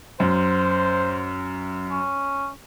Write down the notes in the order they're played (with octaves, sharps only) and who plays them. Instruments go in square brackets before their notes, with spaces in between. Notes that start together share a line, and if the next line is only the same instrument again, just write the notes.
[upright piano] F#2 [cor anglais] C5
[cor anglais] C#4